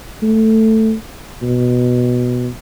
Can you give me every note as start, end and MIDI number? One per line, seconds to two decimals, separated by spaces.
0.22 0.94 57
1.42 2.48 47